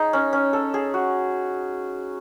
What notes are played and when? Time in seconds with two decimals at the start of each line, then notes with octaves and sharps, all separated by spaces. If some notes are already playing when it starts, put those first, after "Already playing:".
Already playing: D#4 G#4
0.13 C#4
0.33 C#4
0.53 A4
0.74 G#4
0.94 F#4